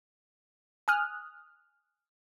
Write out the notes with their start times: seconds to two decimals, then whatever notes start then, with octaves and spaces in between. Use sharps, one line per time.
0.88 G#5 D#6 F6 F#6